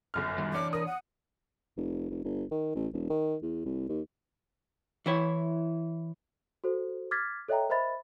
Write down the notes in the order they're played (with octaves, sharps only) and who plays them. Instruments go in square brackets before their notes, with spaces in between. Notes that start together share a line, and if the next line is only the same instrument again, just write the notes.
[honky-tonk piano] G1 F#2 F6
[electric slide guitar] D#3 G3
[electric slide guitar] E3 D4 C#5 [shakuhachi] D6
[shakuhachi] A#4 [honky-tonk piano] D#6
[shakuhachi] F#5
[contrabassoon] F1
F1
G1
D#3
A1
E1
D#3
E2
C2
D#2
[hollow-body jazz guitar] E3 E4 C#5
[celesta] F#4 A4 C5
D6 F6 G#6 A6 B6
A4 C#5 D#5 E5 G5 A#5
A#4 C5 D#5 E5 B5 A6